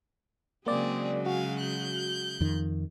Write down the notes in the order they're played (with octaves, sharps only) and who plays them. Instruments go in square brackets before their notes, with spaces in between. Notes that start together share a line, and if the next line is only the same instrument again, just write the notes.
[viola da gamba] C#3 F#3 G#3 [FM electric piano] A#3 D5 [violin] C4 G#4
[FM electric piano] F#4 [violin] F5 G#5
[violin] F#6 G6
[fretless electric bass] F2 D#3